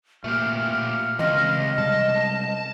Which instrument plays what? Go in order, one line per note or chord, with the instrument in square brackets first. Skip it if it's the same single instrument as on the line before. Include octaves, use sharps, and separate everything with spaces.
[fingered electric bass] A#2 [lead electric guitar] A3 G4 [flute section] F6
[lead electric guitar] C#2 [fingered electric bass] E3 C4 [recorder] D#5
[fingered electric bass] C3 G3 G#3 [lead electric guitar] A5